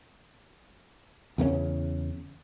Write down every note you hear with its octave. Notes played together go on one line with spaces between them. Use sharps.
E2 C#3 A3 C#4